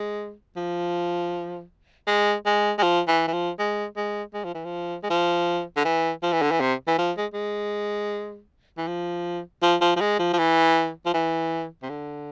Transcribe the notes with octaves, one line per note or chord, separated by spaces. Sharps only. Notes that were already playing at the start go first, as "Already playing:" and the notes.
Already playing: G#3
F3
G#3
G#3
G#3
F3
E3
E3
F3
G#3
G#3
G#3
F3
E3
F3
G#3
F3
D3
E3
F3
E3
D3
E3
C3
E3
F3
G#3
G#3
E3
F3
F3
F3
F3
G#3
F3
F3
E3
F3
E3
C3
D3